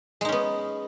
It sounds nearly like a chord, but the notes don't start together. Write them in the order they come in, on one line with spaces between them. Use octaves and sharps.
G#3 D#4 C#4 B3